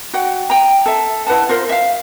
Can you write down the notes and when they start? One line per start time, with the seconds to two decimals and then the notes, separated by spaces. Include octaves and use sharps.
0.14 F#4 F#5 G5
0.50 G5 A#5
0.86 A4 E5
1.27 E4 B4 F#5 A5
1.49 F4 A#4 C5
1.69 E5 F5